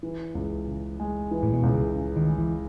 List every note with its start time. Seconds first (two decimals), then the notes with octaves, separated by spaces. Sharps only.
0.03 E3
0.35 C#2
0.67 C#3
1.00 G#3
1.31 E3
1.43 A2
1.53 B2
1.63 C#2
1.74 C#3
1.96 C#3
2.16 D#3
2.28 G#3
2.39 E3